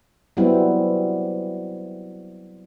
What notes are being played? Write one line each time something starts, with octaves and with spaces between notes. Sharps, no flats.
F#3 G3 B3 C4 E4